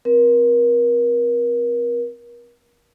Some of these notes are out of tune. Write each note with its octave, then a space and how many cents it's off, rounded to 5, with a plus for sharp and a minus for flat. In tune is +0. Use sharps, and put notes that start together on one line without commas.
C4 +0 A#4 +35